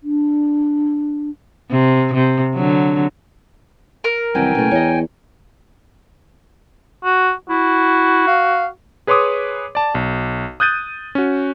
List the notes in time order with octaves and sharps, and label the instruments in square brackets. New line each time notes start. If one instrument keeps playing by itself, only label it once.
[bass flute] D4
[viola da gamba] C3
C3
D3 F#3
[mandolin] A#4
[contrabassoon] C2 [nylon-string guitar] D#3 E3 F#3 [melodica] G5 G#5
[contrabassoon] F#1 [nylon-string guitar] B2 A3
[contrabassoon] E2 [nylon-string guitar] C#5 D#5
[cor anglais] F#4
[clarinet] E4 [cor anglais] F#4
[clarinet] F5
[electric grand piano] G#4 B4 C#5 C6 D6 D#6
D5 A5
B1
D#6 F#6 G6 A6 D#7
C#4 F#4